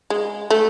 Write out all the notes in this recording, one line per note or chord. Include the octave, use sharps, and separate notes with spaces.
G#3
A3